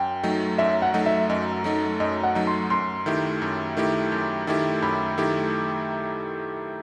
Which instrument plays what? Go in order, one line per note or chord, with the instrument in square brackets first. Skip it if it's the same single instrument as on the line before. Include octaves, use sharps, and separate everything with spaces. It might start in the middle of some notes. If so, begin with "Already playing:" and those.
Already playing: [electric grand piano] F#2 [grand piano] G5
[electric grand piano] F#3 A3 D#4
[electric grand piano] F#2 [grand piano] E5
[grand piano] F#5
[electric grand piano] F#3 A3 D#4
[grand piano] E5
[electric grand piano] F#2 [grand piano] D#5
[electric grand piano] F#3 A3 D#4
[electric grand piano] F#2 [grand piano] D#5
[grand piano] F#5
[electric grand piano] F#3 A3 D#4
[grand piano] C6
[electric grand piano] F#2 [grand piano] C6
[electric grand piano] D#3 A3 E4 G4
F#2
D#3 A3 E4 G4
F#2
D#3 A3 E4 G4
[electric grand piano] F#2 [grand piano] B5
[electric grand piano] D#3 A3 E4 G4